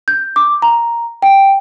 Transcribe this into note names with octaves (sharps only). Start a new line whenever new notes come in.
G6
D6
A#5
G5